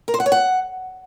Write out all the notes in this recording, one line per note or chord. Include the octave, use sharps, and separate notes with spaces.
A#4
C5
F#5
C#5
F#5